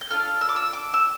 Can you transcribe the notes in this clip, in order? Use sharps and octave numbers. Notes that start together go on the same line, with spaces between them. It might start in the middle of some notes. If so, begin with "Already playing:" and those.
G6
D4 F4 A4 F6
E6
D6
E6
D6
E6